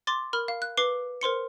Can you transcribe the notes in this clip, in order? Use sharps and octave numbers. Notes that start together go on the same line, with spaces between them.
C6 D6 A6
A#4 B5 F6
F5
F#6
B4 D6 C7 G7
A#4 C5 C6 C#7